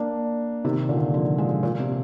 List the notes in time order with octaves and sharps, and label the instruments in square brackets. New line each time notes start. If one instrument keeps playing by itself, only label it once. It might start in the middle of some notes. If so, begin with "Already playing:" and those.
Already playing: [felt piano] A#3 D4
C3 D#3
A#2 D3
D3 F3
F3 G#3
A#2
C3